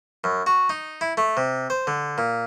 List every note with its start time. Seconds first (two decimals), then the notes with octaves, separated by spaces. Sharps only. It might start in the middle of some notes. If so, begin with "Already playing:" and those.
0.24 F#2
0.47 F#4
0.70 D#4
1.01 E4
1.17 A3
1.37 C3
1.70 C5
1.87 D3
2.18 A#2